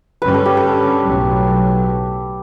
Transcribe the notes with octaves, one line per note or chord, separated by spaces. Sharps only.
G2 D3 G3 C#4 B4
A4
G4
A4
B1 A2 F#3